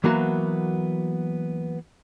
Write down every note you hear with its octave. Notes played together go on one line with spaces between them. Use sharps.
E3 F#3 A#3 B3 F#4